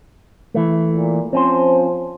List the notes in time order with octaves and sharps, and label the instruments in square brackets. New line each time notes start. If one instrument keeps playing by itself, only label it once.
[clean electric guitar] E3 A3
[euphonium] A#2
[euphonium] F3 [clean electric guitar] C4 C#4 C5